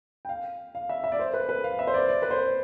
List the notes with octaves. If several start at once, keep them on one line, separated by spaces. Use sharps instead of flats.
G5
F5
F5
E5
E5
D5
C5
B4
B4
F5
E5
C5
D5
D5
B4
C5